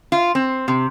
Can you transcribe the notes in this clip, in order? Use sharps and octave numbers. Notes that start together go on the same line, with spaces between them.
F4
C4
C3